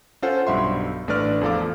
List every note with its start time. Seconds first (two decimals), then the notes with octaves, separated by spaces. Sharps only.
0.22 C#4 F4 A4 C5 F#5
0.47 B1 G2 E5 C6
1.08 A1 A3 D4 B4 D5 F6
1.41 E2 F3 A4 F5 D6